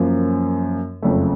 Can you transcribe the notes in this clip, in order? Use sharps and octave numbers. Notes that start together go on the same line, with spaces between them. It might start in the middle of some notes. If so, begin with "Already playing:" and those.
Already playing: F#2 F3 A#3 C#4
F#1 F2 C#3 A3